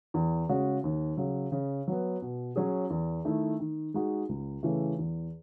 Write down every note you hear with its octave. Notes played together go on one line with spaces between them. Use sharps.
E2
C#3 G#3 C#4 F#4
D#2
C#3 F#3
C#3
F#3 B3
B2
F#3 C#4 G#4
E2
D#3 A3 E4
D#3
G#3 D#4 F#4
C#2
C#3 E3 A3
E2